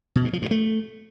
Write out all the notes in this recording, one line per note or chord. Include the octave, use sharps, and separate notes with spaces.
B2
G2
F3
G2
A3